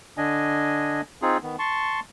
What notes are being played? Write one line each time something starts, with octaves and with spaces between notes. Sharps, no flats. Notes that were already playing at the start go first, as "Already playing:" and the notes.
D3 D4 D#5 G#5
C4 D#4 F4 G#4
D#3 B3
A5 C6 C#6